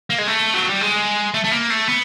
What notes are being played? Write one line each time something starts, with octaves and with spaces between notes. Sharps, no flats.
A#3
G#3
A3
F#3
G3
G#3
A3
A3
A#3
A3
B3